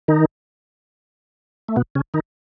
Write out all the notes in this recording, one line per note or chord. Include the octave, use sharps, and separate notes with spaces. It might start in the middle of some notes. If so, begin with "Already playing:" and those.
D#3 D#4
A3
B2 B3
C#3 C#4
D#3 D#4